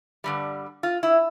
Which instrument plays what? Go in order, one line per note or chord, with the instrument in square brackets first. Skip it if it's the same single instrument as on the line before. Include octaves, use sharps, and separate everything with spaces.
[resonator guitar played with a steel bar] G2 D3 G3
F4
E4